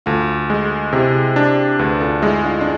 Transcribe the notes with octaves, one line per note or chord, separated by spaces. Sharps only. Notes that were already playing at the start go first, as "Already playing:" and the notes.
D2 F4 A4
G#3
C3 E4 G#4
D4
D2 G#4 B4
F4 A4
G#3 E4 G#4
D4 F4
D4